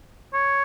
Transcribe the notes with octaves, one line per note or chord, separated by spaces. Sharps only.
C#5